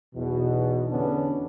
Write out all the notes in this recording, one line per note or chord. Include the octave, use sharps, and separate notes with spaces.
B1 E2 B2
E2 D3 B3 C#4 D4